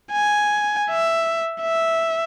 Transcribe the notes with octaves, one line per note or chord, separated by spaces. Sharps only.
G#5
E5
E5